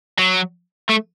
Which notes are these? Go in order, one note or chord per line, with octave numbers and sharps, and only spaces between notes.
F#3
A3